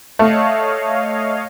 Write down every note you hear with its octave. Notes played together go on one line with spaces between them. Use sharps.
A3 C#5 D#5 F5